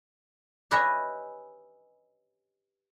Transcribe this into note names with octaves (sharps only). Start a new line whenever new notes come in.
G4 G#4 B4 C#5 D#5 E5